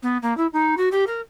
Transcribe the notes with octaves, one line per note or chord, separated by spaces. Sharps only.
B3
A#3
E4
D#4
F#4
G4
A#4